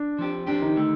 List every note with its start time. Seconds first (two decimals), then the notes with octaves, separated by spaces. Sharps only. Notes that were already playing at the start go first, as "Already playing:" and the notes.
Already playing: D4
0.19 F3 C4 G4
0.47 F3 C4 D4 G4
0.62 D#3 D#4
0.76 D3 A3